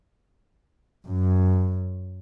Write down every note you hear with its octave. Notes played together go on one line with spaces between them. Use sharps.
F#2